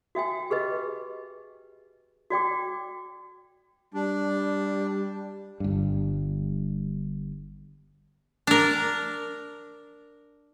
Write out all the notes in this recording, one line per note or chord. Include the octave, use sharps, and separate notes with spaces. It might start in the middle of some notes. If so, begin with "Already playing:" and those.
F#4 E5 G5 G#5
G4 G#4 B4 D#5
F#4 D5 G5 D6
G3 D4
G1 G2
D4 A#4